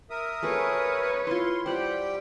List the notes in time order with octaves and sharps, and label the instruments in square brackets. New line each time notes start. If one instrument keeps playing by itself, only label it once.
[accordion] A#4 E5 D#6
[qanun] A3 G#4 [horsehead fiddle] B4 C#5
[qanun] E4 F4 [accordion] C6
[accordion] G3 G4 G5 [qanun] C5 F#5